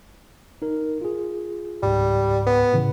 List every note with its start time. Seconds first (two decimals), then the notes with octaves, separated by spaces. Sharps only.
0.62 D#4 A#4
1.01 F4 G#4
1.83 C#2 G#2 G3
2.47 B3
2.73 A2 C#3 E3